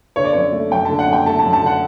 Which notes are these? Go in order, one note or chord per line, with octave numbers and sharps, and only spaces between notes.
D3 C#5
D5
F#2 C#5
A3
F#2 G5
D3 A5
F#5
F#2
G5
A3 A5
A5
F#2
A5
D3 F#5